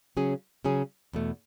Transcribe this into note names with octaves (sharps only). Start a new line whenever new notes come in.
C#3 F#3 C#4 G#4
C#3 F#3 C#4 G#4
E2 B2 A3